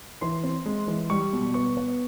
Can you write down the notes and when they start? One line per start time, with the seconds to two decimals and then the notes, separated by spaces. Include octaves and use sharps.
0.21 E3 C6
0.43 C4
0.66 G#3
0.88 E3
1.10 G3 C#6
1.33 B2
1.54 B3 C#6
1.77 B3